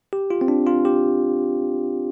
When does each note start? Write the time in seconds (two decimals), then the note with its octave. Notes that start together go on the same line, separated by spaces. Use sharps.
0.13 G4
0.30 F4
0.41 C4
0.48 D4
0.67 F4
0.85 G4